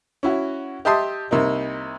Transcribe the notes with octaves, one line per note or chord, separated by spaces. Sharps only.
C#4 E4 F#4
G4 D#5 E5 A5 C6 D#6
C2 C3 A#3 D#4